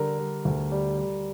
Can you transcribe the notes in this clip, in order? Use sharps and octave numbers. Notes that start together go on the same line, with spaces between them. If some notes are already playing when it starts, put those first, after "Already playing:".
Already playing: D3 G3 A#4
G3
D2
G3
G3